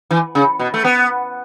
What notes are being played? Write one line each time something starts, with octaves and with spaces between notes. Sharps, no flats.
E3
C#3
B2
A3
B3